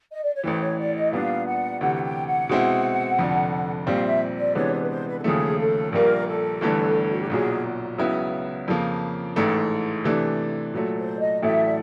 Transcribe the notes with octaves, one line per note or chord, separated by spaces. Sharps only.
D#5
D5
C#5
A1 A2 E3 C5
C#5
D5
D#5
A#2 G3 B3 D4 F5
F#5
D2 C3 E3 F#5
F#5
G5
F#5
B2 G#3 C4 E4
F1 F2 D3
A#1 A#2 G3 C4 F5
E5
D5
C3 E3 G#3 B3 D4 C#5
C5
B4
C5
B4
A4
D#2 C#3 F3 A3 G#4
A4
A#1 A#2 G3 A#3 A#4
A4
G1 G2 E3 A3
F#4
G4
B1 A#2 F#3 G#4
C#2 C#3 F#3 B3 E4
F2 C#3 F3 A#3
A1 G#2 E3 A3
C3 E3 A3 D4
A#2 F#3 A3
C5
D#5
A1 A2 F#3 A3 E5
D5